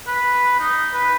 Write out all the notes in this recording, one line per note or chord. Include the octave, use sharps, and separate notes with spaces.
B4
D#4
B4